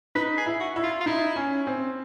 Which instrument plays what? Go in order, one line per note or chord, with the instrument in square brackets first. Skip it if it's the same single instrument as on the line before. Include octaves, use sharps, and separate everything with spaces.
[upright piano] D#4 [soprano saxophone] B4
[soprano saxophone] G#4
[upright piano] E4
[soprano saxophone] F#4
[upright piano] E4
[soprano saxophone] F4
F4
[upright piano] D#4 [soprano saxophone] E4
[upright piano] C#4
C4